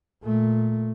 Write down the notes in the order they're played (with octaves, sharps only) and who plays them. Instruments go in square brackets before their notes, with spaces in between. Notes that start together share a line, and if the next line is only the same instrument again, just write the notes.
[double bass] A#2 A3